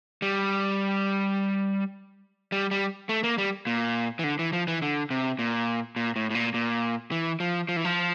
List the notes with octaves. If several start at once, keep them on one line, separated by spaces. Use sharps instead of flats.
G3
G3
G3
A3
A#3
G3
A#2
E3
D3
E3
F3
E3
D3
C3
A#2
A#2
A2
A2
A#2
A#2
E3
F3
F3
E3
F3